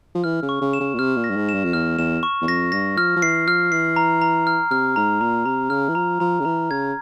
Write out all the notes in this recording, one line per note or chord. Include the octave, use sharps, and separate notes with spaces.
F3
E3 F6
C#3
C#6
C#3
E7
C#3
A#2
C3 F6
A#2
A#6
G2
G#2
E7
G2
F2
E2 F6
E2 E7
C#6
E2
F2 A#6
G2 A#6
F3 F6
F3
E3 C7
F3 F6
E3 C7
A#5
A#5
F6
C3 F6
G#2 A#5
A#2 A#5
C3 A#5
C#3 F6
E3
F3 A#5
F3 A#5
C#3
E3 A#5
C#3 G#6